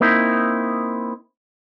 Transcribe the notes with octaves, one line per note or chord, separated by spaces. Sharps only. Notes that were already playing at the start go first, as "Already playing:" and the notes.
A#3 C4 D#4 E4